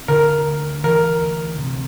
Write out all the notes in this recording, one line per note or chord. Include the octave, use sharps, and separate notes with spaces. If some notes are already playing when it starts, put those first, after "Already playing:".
Already playing: C4
D3 A#4
D2
E3 A#4
D2
C3